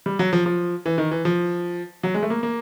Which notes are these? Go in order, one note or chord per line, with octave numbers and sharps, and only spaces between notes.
G3
F#3
F3
F3
E3
D#3
E3
F3
F#3
G#3
A3
A#3
A#3